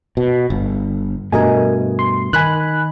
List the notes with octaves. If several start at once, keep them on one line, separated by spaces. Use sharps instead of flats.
B2
G1
G2 B2 A3 A#4 D#5 G#5
C6
D#3 G#5 B5 F#6